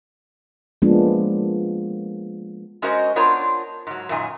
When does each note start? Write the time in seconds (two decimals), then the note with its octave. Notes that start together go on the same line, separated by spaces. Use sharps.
0.82 F3 G#3 A#3 B3 D4
2.82 G#3 C#4 F#4 A#4 C5 D#5
3.16 B3 D4 F4 A#4 C5 C#5
3.87 G#2 F#3
4.09 F#2 A#2 D#3 G#5